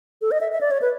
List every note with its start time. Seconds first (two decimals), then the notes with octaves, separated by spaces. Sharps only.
0.22 A4
0.31 D#5
0.41 E5
0.52 E5
0.61 D5
0.71 C#5
0.82 B4